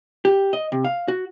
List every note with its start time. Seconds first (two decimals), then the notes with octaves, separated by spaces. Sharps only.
0.25 G4
0.53 D#5
0.72 C3
0.84 F5
1.08 F#4